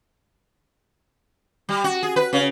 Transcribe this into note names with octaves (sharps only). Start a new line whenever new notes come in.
G3
F#4
G#4
B4
C#3